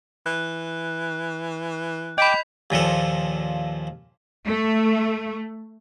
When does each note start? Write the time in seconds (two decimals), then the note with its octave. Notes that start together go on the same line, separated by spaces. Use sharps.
0.26 E3 F#6
2.18 D#5 G5 B5 D6 G6 B6 F7
2.70 D#2 A#2 F3 A4
4.46 A3